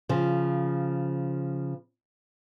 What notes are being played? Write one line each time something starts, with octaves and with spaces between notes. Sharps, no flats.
C#3 F3